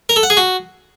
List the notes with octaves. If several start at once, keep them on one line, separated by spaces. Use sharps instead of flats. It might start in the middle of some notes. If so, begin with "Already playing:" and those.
A#4
A4
F#5
G#4
F#4